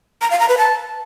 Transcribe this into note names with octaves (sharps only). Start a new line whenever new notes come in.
A#5
F5
A#5
B4
A5